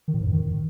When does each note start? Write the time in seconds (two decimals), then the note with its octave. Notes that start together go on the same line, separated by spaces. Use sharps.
0.08 D#3
0.14 A2
0.20 G#2
0.26 F#2
0.33 D#3